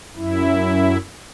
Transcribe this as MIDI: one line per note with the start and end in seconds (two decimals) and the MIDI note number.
0.16 0.97 42
0.16 0.97 64